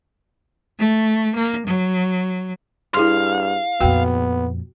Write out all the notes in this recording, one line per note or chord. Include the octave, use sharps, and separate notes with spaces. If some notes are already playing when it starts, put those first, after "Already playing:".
A3
A#3
F#3
G2 E4 G#4 F5 C6
F2 A#2 B3 F#4 G5